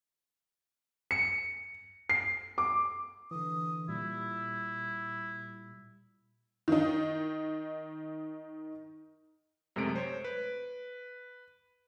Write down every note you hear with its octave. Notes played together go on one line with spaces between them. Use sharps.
C#7
C7
D6
D3 E3 D#6
A#2 G3 E4
D#3 D#4
F#2 C3 G#3 A3 D7
C5 C#5
B4